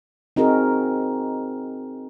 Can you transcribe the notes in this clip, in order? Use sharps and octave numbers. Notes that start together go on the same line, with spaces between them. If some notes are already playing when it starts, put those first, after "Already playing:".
C4 D#4 F#4 G#4 A#4